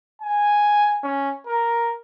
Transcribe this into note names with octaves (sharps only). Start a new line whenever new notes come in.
G#5
C#4
A#4